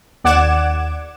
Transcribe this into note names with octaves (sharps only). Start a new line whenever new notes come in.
D#2 D5 F#5 D6 G#6 E7